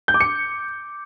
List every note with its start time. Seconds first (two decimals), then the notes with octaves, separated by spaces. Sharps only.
0.08 G6
0.14 D6
0.21 C#7